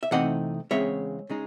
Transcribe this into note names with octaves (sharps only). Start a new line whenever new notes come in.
E5
C3 E3 A3 C4 D#4 D#5 F#5
E2 C#3 G#3 C4 C#5 E5
C#3 G#3 D#4